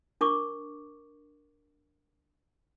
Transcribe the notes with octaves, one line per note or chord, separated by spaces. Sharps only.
D4 A#4 C#6 D6